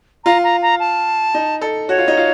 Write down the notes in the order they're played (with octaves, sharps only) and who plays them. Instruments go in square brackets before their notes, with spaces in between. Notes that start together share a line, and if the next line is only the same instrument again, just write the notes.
[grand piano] F4 [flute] A#5
[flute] A#5
A#5
A5
[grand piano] D#4
A4
[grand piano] F#4 [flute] C#5
[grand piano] F4
D#4
F4